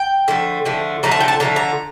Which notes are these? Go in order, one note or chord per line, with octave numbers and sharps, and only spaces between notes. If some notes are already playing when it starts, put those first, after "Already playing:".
Already playing: G5
D3 F3 A3
D3 F3 A3
D3 F3 A3 A#5
A5
G5
A5
D3 F3 A3 A#5
A#5